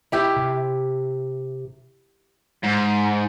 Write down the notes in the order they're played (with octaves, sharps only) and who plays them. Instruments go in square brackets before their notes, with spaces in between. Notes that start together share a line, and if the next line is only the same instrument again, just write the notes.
[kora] E4 G4
[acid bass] C3
[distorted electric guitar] G#2